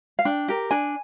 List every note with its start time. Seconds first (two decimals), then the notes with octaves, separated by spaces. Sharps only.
0.19 F5
0.25 D4 G5
0.48 G4 A#4
0.71 D4 G#5